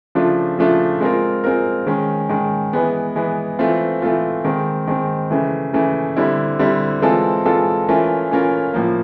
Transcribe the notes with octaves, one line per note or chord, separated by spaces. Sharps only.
C#3 F3 A3 D4 F4
C#3 F3 A3 D4 F4
G#3 C4 F4 A#4
G#3 C4 F4 A#4
D#3 G#3 C#4
D#3 G#3 C#4
E3 G#3 B3
E3 G#3 B3
E3 A3 C4 F4
E3 A3 C4 F4
D#3 G#3 C4
D#3 G#3 C4
C#3 E3 A3
C#3 E3 A3
D3 G3 C4 E4
D3 G3 C4 E4
E3 G#3 C4 F4 A4
E3 G#3 C4 F4 A4
E3 A3 C#4 F4 A#4
E3 A3 C#4 F4 A#4
A2 F3 A#3